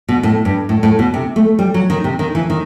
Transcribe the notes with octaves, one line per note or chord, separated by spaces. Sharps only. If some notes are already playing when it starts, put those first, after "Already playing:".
B2
A2
G2
A2
A2
B2
C3
A3
G3
F#3
D#3
C3
D#3
E3
D#3